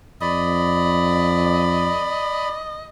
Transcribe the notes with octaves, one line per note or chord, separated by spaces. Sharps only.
F2 D5 D#5 B5